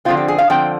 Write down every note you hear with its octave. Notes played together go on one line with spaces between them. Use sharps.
D3 F3 C4 F4
G4
G#4
F5
D3 F3 C4 G5